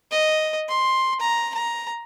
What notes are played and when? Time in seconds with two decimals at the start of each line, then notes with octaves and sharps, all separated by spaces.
0.11 D#5
0.69 C6
1.20 A#5
1.54 A#5